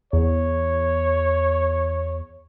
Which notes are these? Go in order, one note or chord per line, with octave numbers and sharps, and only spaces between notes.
E2 C#5